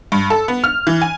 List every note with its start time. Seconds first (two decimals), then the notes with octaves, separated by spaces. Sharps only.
0.12 G2
0.30 A4
0.48 B3
0.64 F6
0.87 E3
1.02 G#5